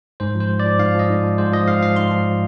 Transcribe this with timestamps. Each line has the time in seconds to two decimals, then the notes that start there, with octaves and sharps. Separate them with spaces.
0.20 G#2 C5
0.35 F3
0.40 C5
0.50 G#2
0.60 D5
0.65 F3
0.79 G#2 F5
0.95 F3 D#5
1.09 G#2
1.24 F3
1.38 G#2 C5
1.53 F3 D#5
1.67 G#2 F5
1.82 F3 F5
1.96 G#2 C6
2.11 F3